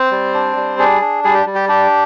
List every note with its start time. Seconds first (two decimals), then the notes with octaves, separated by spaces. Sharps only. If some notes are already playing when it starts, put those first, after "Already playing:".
Already playing: C4 C5
0.11 G3
0.34 D4
0.56 G3
0.79 D4 G#4
1.01 D4
1.24 G3 G#4
1.34 G4
1.46 G3
1.55 G4
1.69 D4 G4